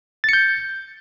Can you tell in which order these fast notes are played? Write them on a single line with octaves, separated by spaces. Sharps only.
A6 C#7 G6